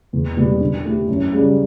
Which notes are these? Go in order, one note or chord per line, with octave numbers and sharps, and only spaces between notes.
E2
B2 G3 B3
D3
A3 E4 G4
F#2
C#3 G3